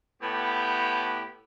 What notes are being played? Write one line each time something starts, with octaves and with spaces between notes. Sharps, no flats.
A2 B3 G4